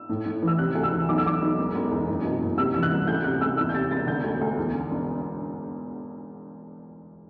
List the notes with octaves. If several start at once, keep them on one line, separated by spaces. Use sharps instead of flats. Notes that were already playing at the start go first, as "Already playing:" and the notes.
Already playing: E6
A2
A2
E3 E6
C3 F#6
D2
E6
E3
B1 D6
E6
B1 D6
B1
E1
E1
E2
F#1
B2
F#1
C3 E6
E3 E6
F#6
C2
D2 G6
C3 F#6
D2 E6
E2 E6
G6
C3 A6
E1 A6
D3 G6
D2
D2
E2
D3
E1